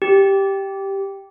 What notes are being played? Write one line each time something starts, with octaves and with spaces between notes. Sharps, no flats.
G4